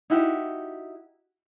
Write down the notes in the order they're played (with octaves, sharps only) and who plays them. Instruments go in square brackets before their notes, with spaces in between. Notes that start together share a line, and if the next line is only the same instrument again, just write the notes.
[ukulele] D#4 E4 F#4 G4